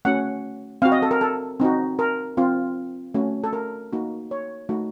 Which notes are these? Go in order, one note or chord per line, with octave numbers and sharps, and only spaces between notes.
A3 C#4 F#4 F#5
C4 F#4 F5
D#5
A4
A#4
A4
C4 D#4 F#4
A#4
C4 F4
A3 C#4 F#4
A4
A#4
A#3 D#4 F#4
C#5
A3 D#4 F#4